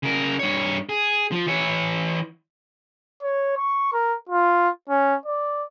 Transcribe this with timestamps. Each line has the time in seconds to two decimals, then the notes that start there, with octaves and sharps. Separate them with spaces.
0.03 C#3 A#4
0.39 G2 C#5
0.89 G#4
1.32 F3
1.47 E3 C#5
3.22 C#5
3.57 C#6
3.93 A#4
4.29 F4
4.89 C#4
5.26 D5